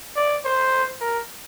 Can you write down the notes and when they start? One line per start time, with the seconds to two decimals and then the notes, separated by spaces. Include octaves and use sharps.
0.16 D5
0.45 C5
1.01 A#4